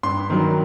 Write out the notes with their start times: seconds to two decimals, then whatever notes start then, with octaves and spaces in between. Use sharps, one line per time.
0.03 G2 C6
0.30 D#3 F#3